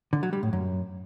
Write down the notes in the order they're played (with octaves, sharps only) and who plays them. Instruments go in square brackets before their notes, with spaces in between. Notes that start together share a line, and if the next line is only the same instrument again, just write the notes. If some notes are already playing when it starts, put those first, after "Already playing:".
[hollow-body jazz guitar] D3
F#3
G3
A2
F#2